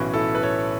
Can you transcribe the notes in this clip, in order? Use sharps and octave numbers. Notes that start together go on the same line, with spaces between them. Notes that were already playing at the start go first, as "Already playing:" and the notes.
Already playing: B1 A2 E3 C#4 F#4 B4
E4 A4
B4
A4 C#5